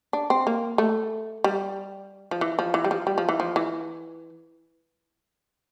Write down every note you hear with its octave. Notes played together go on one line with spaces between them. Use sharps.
D4
C4
A#3
A3
G3
F3
E3
F3
E3
G3
F3
G3
F3
E3
F3
E3